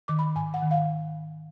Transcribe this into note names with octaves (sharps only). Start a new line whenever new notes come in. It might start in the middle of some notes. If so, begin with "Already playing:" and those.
D#3 D6
B5
G#2 G#5
F#5
D#3
F5